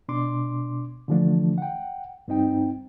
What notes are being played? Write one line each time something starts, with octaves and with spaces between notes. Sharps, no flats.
B2 D4 C6 D6
D3 E3 F3 A3 D4
F#5 G5
G2 C4 D#4 G5